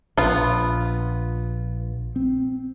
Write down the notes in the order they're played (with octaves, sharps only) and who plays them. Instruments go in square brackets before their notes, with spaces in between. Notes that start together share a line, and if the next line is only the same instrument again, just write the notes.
[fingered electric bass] A#1 [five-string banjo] B3 F4
[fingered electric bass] C4